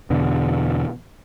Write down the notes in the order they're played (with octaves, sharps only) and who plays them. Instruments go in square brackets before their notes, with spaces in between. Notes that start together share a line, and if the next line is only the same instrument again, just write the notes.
[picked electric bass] E2 B2 D3